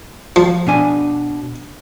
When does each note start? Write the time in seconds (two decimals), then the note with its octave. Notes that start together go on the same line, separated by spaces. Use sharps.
0.36 F3
0.67 B2 D4 G#5